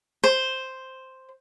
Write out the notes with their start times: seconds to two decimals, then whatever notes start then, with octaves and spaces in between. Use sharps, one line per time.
0.24 C5